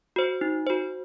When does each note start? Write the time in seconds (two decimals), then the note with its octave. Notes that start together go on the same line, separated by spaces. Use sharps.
0.16 F#4 C5
0.41 D#4
0.67 F#4 C5